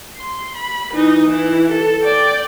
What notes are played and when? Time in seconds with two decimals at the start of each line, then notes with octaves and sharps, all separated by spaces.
0.17 C6
0.55 B5
0.94 E3 D#4
1.26 E3 E4
1.71 A4
2.03 D5 G5